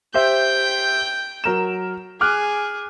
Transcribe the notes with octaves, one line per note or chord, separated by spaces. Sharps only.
G4 C5 E5 G5 G6
F#3 A#4 E7
G#4 D6 F6 F#6